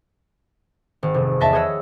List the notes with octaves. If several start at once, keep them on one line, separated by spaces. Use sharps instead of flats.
G#1
F1
E2 D#5 E5 A5
G#4 B4 C#5 D#5 F#5 E6